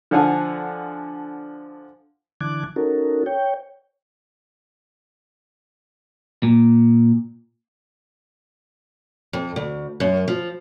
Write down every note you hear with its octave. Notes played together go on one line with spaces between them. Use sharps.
D3 F3 A4 F5 F#5 G#5
D3 E3 A5 D6 F#6 G#6
C#4 D#4 F#4 A4 A#4
C#5 G5
A#2
F2
D2
F#2
F3